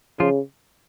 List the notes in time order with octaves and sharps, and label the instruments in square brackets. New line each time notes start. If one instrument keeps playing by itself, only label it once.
[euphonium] C#3 [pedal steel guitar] F3 F4